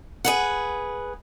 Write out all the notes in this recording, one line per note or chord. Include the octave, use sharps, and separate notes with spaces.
G#4 B4 F#5